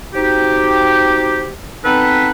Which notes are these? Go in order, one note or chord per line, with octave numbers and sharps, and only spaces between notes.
C4 D#4 F#4 G4
B3 C4 D#4 A4 B4